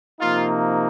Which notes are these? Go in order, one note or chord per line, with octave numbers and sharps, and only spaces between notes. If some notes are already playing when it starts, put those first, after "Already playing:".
C3 F3 A#3 D#4 F4